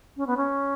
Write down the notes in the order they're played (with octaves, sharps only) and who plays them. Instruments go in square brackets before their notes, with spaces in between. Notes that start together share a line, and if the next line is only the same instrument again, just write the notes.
[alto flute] C#4
B3
C#4